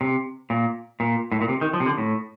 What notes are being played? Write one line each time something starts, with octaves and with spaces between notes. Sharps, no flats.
C3
A#2
A#2
A2
A#2
C3
D#3
F3
C3
D3
A2